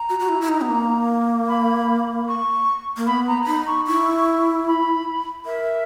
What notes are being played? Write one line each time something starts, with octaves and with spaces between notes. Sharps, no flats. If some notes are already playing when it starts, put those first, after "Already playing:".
Already playing: A#5
F#4
F#4
E4
E4
D#4
B3
A#3
B5
C#6
A#3
B3 B5
A#5
A#5
D#4 B5
C#6
E4 C#6
B5
A#4 E5